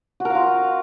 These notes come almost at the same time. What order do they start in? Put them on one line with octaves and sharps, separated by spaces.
F#4 A#4 F5 F4